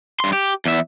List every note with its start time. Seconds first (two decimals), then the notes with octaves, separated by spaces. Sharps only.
0.20 G2 C6
0.33 G4
0.66 E2 E5